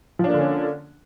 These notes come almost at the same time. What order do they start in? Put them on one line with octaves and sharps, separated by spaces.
F3 D4 A#3 D3 C#4